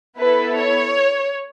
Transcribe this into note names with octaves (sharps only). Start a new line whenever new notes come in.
B3 E4 A4 B4
C#5